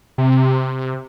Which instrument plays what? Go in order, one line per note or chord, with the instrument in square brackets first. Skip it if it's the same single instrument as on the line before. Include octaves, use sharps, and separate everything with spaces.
[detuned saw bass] C3